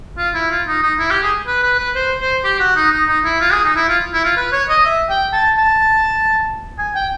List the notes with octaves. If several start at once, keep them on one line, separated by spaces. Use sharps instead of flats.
F4
E4
F4
D#4
D#4
E4
G4
G#4
B4
B4
B4
C5
C5
G4
F#4
D#4
D#4
D#4
E4
F4
G#4
D#4
E4
F4
E4
F4
B4
C#5
D#5
E5
G5
A5
A5
G#5
G5